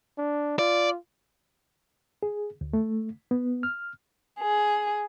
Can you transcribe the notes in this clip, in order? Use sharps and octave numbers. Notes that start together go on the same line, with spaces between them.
D4
F4 D5
G#4
D2
A3
B3
F6
G#4